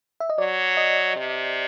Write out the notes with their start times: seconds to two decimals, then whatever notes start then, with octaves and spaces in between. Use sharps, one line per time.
0.20 E5
0.30 D#5
0.38 F#3 D5
0.77 D#5
1.16 C3